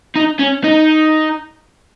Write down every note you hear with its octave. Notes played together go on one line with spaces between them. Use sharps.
D#4
C#4
D#4